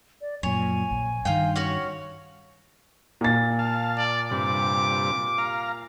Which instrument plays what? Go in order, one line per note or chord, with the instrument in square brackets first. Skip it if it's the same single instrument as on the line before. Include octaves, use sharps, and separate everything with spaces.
[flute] D5
[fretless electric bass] F#2 A#2 [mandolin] C#5 [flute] G#5
[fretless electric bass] A#1
[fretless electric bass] G2 D#3 [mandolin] F4 G5
[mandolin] C#4 F#4 C#5
[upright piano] A#2 A6
[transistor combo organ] F5 A5
[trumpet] D5
[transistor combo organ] G2 C3 [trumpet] D6
[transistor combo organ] F5 A#5